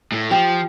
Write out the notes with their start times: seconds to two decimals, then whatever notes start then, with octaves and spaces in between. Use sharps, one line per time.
0.12 A2
0.31 F3 G4